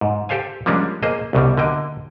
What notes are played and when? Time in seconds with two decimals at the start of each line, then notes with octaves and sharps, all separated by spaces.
0.01 G#2
0.29 G4 A4 C5 F5 G#5
0.66 F3 G3 G#3 A#3 C#4 D4
1.03 A#3 G#4 C5 D#5
1.33 C2 B2 G3
1.58 D3 A#3 D#5 G5